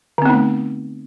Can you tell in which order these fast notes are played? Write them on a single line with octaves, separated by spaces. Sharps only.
D3 C4 B3 D#4 A3